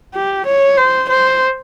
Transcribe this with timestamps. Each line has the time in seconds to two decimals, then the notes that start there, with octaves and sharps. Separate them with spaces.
0.15 G4
0.47 C#5
0.78 C5
1.10 C5